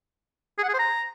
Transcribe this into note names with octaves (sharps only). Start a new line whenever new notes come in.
G#4
F#5
G#4
C5
A#5